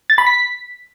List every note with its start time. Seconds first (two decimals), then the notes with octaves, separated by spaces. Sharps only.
0.10 A6
0.18 B5
0.27 B6